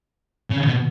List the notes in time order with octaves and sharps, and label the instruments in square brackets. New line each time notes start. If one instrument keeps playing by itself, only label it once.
[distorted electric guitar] C#3
B2